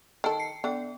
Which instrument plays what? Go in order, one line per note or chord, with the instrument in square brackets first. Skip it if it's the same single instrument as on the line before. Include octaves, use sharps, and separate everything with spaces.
[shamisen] D#3 A4 [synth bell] G5 A5
[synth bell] C7 C#7
[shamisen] D3 [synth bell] B3 G5